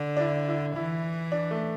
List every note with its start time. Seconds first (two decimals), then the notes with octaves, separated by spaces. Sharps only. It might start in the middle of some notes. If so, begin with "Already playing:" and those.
Already playing: D3
0.17 D4
0.20 E4
0.48 E4
0.76 E3 E4
1.32 D4
1.51 A3